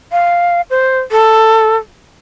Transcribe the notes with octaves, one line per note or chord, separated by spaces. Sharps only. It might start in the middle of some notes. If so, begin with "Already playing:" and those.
F5
C5
A4